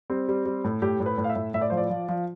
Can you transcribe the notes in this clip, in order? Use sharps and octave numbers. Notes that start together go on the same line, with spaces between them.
G3 C4
G3
G3
A2
A2 G4
A2
B4
A2
F5
E5
A2
A2 E5
D5
F3 C5
D5
F3
F3